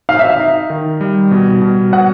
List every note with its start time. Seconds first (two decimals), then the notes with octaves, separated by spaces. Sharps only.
0.09 D#4 F5
0.19 E5
0.30 F5
0.40 D#4
0.70 D#3
1.01 G3
1.31 B2
1.62 B2
1.93 B2 F#5